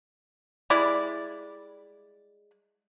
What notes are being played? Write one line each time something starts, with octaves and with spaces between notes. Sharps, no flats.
G3 G#3 E4 D5